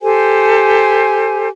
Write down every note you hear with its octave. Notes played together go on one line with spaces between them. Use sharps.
G4 A4 C5 G#5